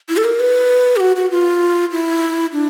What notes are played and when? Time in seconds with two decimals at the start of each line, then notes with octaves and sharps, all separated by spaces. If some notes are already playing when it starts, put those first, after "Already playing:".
0.09 E4
0.17 A4
0.24 A#4
0.40 B4
0.96 G4
1.00 F#4
1.16 F#4
1.31 F4
1.92 E4
2.53 D4